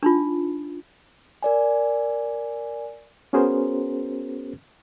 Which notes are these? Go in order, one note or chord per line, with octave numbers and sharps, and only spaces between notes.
D4 D#4 F4
A#4 D5 G#5
B3 C#4 F#4 G#4 A#4 C5